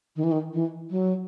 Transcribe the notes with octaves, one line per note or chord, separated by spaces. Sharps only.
D#3
E3
D#3
E3
F#3